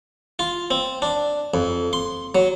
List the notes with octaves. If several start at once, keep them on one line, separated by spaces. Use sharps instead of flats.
F4
C4
D4
F2
C6
F#3